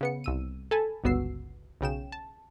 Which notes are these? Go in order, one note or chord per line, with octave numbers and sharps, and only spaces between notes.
C#3 B3 C#7
C2 E6 D#7
A4 G#5 A5 B5
G1 C#2 B3 F#4 E6 C7
B1 C#3 G5 E7
A5